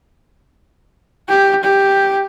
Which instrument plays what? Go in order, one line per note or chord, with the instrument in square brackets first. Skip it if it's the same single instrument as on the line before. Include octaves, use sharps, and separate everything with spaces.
[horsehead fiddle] G4
G4